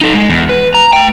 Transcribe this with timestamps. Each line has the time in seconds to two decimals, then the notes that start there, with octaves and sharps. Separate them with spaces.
0.01 D#4 A4
0.13 G#3
0.30 E2
0.49 B4
0.74 A#5
0.93 A3 G5